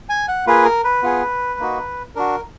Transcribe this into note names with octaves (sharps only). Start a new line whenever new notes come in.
G#5
F#5
A#3 F4 G#4 B4
A#4
B4
B3 F4 G#4
A#3 D#4 F#4
D4 F#4 A#4